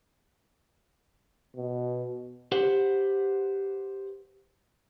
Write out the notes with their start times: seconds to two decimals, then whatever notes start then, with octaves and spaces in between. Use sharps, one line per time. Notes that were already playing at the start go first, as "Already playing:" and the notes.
1.57 B2
2.52 G4 B4 C5 F#5